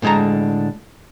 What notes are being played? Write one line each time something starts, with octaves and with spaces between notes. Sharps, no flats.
A2 D3 G#3 A5 A#5